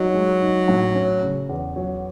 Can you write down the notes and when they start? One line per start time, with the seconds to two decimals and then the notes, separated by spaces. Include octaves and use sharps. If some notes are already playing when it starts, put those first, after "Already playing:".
Already playing: F#3 D#4
0.14 G#3
0.41 D#4
0.68 A2
0.95 C#4
1.22 C#3
1.49 E2
1.76 F#3